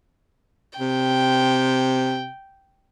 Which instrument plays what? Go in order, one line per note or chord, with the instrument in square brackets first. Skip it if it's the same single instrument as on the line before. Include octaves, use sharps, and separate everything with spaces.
[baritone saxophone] C3 [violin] G5